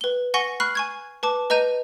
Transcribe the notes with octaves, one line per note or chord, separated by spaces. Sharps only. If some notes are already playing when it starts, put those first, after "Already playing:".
B4 G7
F#5 G#5 C#6 A#6 C#7 G7
B5 C#6 F6 F#6 C7
G#5 C#6 G#6
B4 A5 D6
B4 D#5 A#5 G6 D#7